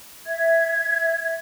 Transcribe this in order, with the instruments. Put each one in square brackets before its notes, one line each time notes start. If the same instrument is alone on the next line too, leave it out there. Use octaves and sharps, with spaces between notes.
[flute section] E5 G#6